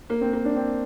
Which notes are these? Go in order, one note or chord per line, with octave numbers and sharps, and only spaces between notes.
A#3
C4
A#3
D4
C4